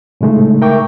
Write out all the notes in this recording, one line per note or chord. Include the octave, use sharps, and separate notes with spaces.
A2 C#3 G#3 A3 D#4
A#4 E5 G5 C#6 D6